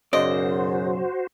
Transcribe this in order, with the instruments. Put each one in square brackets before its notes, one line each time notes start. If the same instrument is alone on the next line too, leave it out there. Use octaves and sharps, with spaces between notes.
[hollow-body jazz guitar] B1 D5 [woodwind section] F#2 C#3 [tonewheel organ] F#4 C5 [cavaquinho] D#5